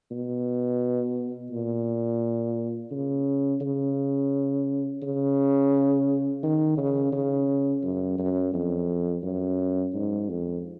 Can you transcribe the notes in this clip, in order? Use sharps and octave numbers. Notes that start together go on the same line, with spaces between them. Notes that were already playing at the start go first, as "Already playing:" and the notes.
B2
A#2
C#3
C#3
C#3
D#3
C#3
C#3
F#2
F#2
F2
F#2
G#2
F2